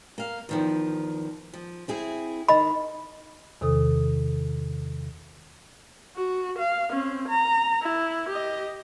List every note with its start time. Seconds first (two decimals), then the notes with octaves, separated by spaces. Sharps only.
0.18 A#3 F5
0.49 E2 D#3 F3
1.53 F3
1.88 C4 E4 G#4
2.48 D#3 D#5 B5
3.61 E2 C3 D#3 A4 D#6
6.16 F#4
6.58 F5
6.93 C4 C#4
7.28 A#5
7.82 E4
8.29 G4 D#5